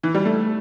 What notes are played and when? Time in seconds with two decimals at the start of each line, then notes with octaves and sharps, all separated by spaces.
0.03 E3
0.15 G3
0.25 A3